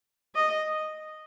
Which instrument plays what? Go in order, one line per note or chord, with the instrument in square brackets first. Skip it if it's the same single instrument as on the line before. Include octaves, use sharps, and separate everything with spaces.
[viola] D#5